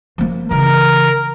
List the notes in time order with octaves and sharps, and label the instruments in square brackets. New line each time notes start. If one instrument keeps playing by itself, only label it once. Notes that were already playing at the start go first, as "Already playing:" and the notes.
[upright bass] F3 A#3
[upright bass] C#3 E3 [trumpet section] A#4